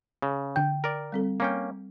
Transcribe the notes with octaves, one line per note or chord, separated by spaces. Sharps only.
C#3
D3 G5 G6
A#4 D5
G3 C4 A4
A#3 C#4 G5